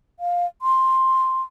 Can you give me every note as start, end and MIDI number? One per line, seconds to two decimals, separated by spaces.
0.20 0.46 77
0.62 1.42 84